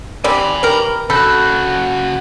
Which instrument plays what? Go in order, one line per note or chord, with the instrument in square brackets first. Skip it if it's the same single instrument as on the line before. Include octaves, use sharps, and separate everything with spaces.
[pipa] G3 C4 G4 [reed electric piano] D5 [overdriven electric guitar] G#5 B5
[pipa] G4 A#4 [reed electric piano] B4
[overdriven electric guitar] C#3 F#4 [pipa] A4 [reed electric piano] B5 G6